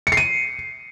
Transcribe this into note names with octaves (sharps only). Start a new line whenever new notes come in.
C#7
C7
D#7